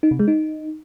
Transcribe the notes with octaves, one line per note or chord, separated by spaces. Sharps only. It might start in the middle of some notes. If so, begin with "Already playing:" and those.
D#4
C3
G#3
D#4